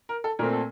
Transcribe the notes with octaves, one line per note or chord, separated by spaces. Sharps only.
A#4
A4
A#2 A3 C4 A#4
A4